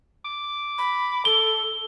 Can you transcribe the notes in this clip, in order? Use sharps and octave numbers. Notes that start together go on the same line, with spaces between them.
D6
B5
A4 G7